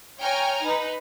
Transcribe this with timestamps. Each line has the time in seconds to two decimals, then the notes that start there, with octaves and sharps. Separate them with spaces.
0.21 C#5 G5 G#5 A#5 F6
0.64 D#4 B4